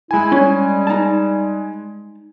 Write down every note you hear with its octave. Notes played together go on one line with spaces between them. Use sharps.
G#3 E4 G#5
G3 C#4
D#4 A5